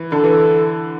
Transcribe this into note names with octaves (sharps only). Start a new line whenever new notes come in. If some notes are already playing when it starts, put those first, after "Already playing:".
Already playing: E3
D3 A4
E3